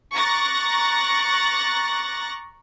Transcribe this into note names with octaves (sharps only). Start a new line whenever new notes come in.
A#5 C#6 D6 F#6 A6 A#6